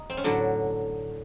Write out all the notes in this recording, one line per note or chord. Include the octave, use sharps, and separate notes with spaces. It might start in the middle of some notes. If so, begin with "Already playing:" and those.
Already playing: D#4
C4
C#4
A2 D3 F#3 D4